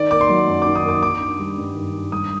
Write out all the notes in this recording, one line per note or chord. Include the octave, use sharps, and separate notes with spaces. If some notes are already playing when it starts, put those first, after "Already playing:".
Already playing: D#3 D5
A#3 D6
C6
F#3
F#2
D#3 D6
D#6
A#3 D6
D#3 D6
D4
G3
G2
D#3
D4
G3 D#6